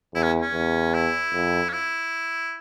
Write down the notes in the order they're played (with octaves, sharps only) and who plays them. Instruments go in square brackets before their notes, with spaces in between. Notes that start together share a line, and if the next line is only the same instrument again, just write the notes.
[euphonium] E2 [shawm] E4
[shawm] C#4
C#4
[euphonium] E2
[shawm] E4
[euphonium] F2
[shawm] C#4
E4